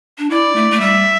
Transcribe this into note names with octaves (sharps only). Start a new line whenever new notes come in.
D4
E4 D5
A3
A3
G3 E5